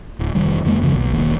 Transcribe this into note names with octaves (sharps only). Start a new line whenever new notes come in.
D1
F1 E2 D#3 G3
F2 D#3 G#3 A#3
F2 C#3 F3
B1
E1 D#3 A#3